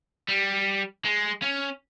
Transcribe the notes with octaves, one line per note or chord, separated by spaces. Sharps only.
G3
G#3
C#4